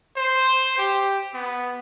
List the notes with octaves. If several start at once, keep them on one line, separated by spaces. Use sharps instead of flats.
C5
G4
B3